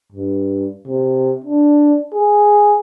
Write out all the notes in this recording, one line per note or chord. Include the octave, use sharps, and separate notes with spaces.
G2
C3
D4
G#4